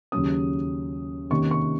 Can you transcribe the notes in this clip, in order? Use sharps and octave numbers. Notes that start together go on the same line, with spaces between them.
D#2 C#3 F#3 C#4 D#6
C3 D#3 A#3 C#4 C#6
C#6